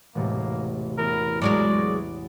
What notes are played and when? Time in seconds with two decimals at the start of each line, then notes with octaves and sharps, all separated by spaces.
0.15 E1 A1 C3 A#3
0.98 E2 B3 A#4 D7
1.42 F#3 G#3 A#4 D5